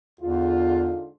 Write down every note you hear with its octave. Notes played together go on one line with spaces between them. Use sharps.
E2 G#2 D3 F4